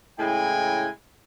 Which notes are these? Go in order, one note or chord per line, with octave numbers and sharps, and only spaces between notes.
A2 C#3 G#3 E4 G5 G#5